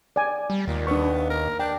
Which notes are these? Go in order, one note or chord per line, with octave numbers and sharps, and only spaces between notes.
D5 G#5
G3
D#2 A#2
B3 D4 C#6
A#4
D4 G5